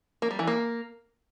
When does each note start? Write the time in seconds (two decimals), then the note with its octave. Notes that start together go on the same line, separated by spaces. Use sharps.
0.22 A#3
0.31 G3
0.39 E3
0.47 A#3